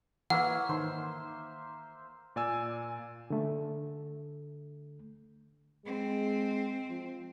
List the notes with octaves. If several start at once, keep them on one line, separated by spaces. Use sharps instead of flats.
E3 A#3 B4 C#5 E5 F#5
D#3 C5
A#2 D5 G#5 E6
D3 A3
G#3 C4
F3